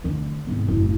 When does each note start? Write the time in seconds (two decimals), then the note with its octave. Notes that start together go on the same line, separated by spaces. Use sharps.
0.04 D2 D3
0.47 G#1 B3
0.68 F#1 A2